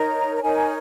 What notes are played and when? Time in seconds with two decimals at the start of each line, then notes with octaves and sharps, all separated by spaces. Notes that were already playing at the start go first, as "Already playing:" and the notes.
Already playing: D#4 A#4 C#5 A#5
0.35 A#5
0.42 D#4 A#4 C#5 G#5